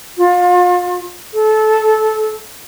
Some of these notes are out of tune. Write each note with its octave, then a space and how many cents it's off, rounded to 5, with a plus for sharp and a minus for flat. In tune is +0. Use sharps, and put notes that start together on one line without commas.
F4 +35
A4 -20